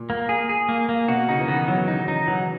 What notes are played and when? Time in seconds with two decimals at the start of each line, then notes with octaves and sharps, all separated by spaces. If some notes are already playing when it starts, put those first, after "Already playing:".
Already playing: A#2
0.10 A#3
0.29 G#4
0.49 G#4
0.69 A#3
0.89 A#3
1.08 B2 F#4
1.29 C#3 D#4
1.40 E3
1.48 D#3 B3
1.68 D#3 F#3
1.88 C#3 D#4
2.08 E3 D#4
2.28 E3 F#3